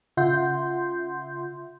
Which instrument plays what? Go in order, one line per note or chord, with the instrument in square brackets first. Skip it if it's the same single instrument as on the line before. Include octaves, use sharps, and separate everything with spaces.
[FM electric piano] C#3 F4 E5 F#5 C6 G6